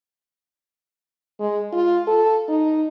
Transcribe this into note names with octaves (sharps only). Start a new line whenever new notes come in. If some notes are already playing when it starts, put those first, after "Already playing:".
G#3
F4
A4
D#4